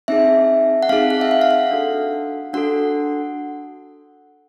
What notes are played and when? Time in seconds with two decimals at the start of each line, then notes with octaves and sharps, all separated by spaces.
0.08 C4 D#4 G#4 E5
0.83 F#5
0.89 C4 D#4 G#4 F5
1.10 F#5
1.21 E5
1.31 F5
1.41 F5
1.51 F#5
1.71 D4 F#4 A4
2.53 D4 F#4 A4 F#5